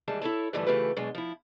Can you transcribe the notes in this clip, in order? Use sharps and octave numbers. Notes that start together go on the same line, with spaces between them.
D#2 E3 G3 G#3 A5
E4 A4 C#5 A5
G2 D3 E3 F3 G3 A3
C#3 E3 A3 F4 G4 B4
B2 F#3 G#3 D4
F3 E4